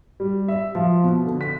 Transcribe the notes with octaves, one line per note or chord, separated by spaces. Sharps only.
G3
E5
F3
B2
D3
B6